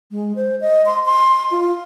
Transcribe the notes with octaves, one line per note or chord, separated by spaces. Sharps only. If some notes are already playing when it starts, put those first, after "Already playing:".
G#3
C5
D#5
C6
C6
F4